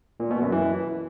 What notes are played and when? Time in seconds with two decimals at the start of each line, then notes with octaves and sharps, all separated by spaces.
0.20 A#2
0.30 B2
0.41 F#2
0.52 E3